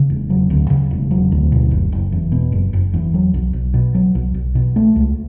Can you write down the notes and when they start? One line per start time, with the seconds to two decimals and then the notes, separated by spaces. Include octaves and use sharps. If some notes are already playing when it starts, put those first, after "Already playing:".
Already playing: C#3
0.10 E1
0.30 F#3
0.50 D2
0.70 C#3
0.91 E1
1.11 F#3
1.32 D2
1.52 B2
1.71 F#1
1.92 F#1
2.12 E2
2.32 B2
2.52 F#1
2.73 F#1
2.94 E2
3.14 F#3
3.34 B1
3.53 B1
3.74 B2
3.94 F#3
4.15 B1
4.34 B1
4.55 B2
4.76 A3
4.96 C#2